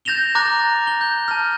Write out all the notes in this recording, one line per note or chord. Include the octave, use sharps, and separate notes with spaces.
G6 A6 A#6 E7 F7 G7
A#5 D6 F#6 A6 A#6
G7
G6
A5 F6